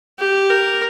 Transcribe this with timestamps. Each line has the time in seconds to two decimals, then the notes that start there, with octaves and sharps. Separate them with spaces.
0.19 G4
0.50 A#4